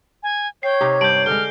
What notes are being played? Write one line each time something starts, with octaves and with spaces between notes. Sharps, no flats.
G#5
C#5 G5 C7
C3 D#4 G4
G2 G6 D7 F#7
D3 G#3 F6 G7